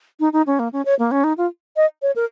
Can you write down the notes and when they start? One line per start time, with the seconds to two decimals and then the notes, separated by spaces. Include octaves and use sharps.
0.20 D#4
0.33 D#4
0.47 C#4
0.59 A#3
0.73 C#4
0.85 C#5
0.99 A#3
1.11 C#4
1.24 D#4
1.38 F4
1.76 D#5
2.02 C#5
2.16 A#4